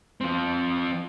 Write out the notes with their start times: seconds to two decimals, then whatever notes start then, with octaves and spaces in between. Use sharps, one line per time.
0.21 F3 C4